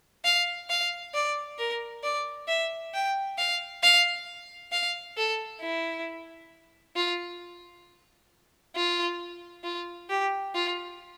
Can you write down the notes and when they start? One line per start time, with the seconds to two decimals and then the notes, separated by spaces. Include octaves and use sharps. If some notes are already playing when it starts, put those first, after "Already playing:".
0.25 F5
0.70 F5
1.14 D5
1.58 A#4
2.03 D5
2.48 E5
2.94 G5
3.38 F5
3.83 F5
4.72 F5
5.17 A4
5.61 E4
6.96 F4
8.75 F4
9.64 F4
10.09 G4
10.54 F4